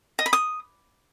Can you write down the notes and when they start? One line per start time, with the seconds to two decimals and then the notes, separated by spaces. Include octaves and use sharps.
0.19 D#5
0.26 B5
0.33 D#6